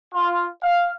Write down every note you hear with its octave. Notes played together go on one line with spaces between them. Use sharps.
F4
F5